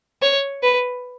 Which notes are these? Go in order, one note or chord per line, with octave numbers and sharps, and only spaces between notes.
C#5
B4